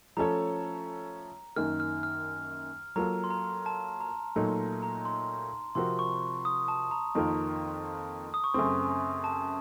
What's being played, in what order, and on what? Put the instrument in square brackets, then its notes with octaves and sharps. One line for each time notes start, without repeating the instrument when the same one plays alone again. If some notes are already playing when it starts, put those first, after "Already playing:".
[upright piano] F3 A3 C#4 A4 C#5 [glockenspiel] A#5
[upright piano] F#2 D#3 A#3 [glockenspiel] F6
[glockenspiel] F6
F6
[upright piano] F#3 A#3 F4 A4 [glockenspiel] A#5
[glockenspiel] C6
A#5
A5
A#5
[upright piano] A#2 F#3 A3 D#4
[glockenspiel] A#5
C6
[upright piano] C3 F3 C4 F#4 A#4 [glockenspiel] C6
[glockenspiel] C#6
D#6
A5
A#5
[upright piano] F2 D#3 A#3 F4 A#4
[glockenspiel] D#6
C#6
[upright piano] F#2 C#3 A3 C4 [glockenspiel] C6
[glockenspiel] A5